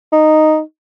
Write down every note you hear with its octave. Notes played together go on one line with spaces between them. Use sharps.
D#4